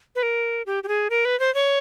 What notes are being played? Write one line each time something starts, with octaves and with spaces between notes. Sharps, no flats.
B4
A#4
G4
G4
G#4
A#4
B4
C5
C#5